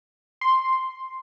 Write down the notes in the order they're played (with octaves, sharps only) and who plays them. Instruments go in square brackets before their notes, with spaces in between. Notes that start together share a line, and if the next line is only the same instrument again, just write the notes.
[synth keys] C6